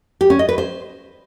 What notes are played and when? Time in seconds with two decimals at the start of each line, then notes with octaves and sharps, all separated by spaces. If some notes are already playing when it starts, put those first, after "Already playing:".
0.21 G4
0.30 C#4
0.39 D#5
0.49 B4
0.58 C5